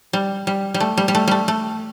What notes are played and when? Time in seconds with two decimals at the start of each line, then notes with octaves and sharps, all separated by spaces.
0.13 G3
0.47 G3
0.74 G3
0.80 A3
0.97 G3
1.08 G3
1.15 A3
1.28 G3 A3
1.48 A3